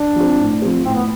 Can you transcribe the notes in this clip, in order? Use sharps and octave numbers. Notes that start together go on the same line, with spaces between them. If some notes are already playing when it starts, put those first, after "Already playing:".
Already playing: D4
F3 C4
A2
F3 C4
A2 C4
B3